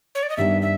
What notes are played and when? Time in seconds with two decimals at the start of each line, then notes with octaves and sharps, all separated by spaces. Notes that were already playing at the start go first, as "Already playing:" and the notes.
0.15 C#5
0.23 D5
0.29 D#5
0.37 G2 D#3 G3 B3 D4 E5
0.62 E5